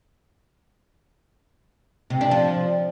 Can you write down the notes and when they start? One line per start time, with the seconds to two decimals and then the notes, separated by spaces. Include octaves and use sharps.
2.10 C3
2.21 D4
2.31 F3